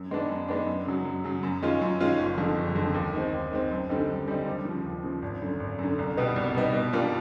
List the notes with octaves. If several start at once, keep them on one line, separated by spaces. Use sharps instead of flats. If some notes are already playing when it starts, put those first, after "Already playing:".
Already playing: F#2
D#3 G#3 B3 D4
F#2
D#3 G#3 B3 D4
F#2
C#3 F#3
F#2
C#3 F#3
F#2
D#3 G#3 C#4 F4
F#2
D#3 G#3 C#4 F4
F#1
F2 D3
F#1
F2 D3
D#2
D#3 G#3 C4
D#2
D#3 G#3 C4
F#2
D3 G3 C4 D#4
F#2
D3 G3 C4 D#4
D#2
C#3 F3
D#2
C#3 F3
G#1
F#2 D3
G#1
F#2 D3
C2
B2 G3 B3 D#4
C2
B2 G3 B3 D#4
B2
G3 A#3 D4 F4